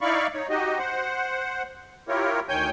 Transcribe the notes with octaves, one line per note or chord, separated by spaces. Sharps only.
D#4 E4 D5 F5 B5 C#6
D#4 C#5
D#4 F#4 G4 D#5
C5 F#5
E4 F4 G4 A#4 C#5
D2 D#3 C#5 G5 G#5 G6